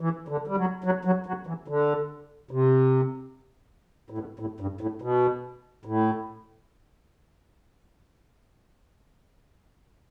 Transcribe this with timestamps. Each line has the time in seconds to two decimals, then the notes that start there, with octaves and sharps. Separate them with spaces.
0.01 E3
0.28 D3
0.47 G3
0.57 F#3
0.84 F#3
1.05 F#3
1.26 F#3
1.47 E3
1.68 D3
2.51 C3
4.10 A2
4.18 B2
4.39 A2
4.60 G2
4.81 A2
5.02 B2
5.85 A2